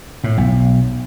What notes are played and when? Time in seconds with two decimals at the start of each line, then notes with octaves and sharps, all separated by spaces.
0.24 A2
0.38 B1